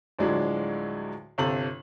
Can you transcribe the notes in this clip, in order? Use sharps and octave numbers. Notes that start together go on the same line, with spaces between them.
D2 A2 F3 F#3 G#3 D4
G1 C3 A4 F#7